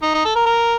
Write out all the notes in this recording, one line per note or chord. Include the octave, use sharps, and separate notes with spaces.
D#4
D#4
A4
A#4
A#4